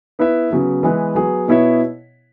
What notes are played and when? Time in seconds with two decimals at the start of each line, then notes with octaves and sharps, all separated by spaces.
0.19 B3 E4 B4 E5
0.51 C#3 F#3 B3
0.83 E3 G#3 B3 E4 B4
1.15 F#3 B3 G#4
1.48 B2 B3 E4 C#5 E5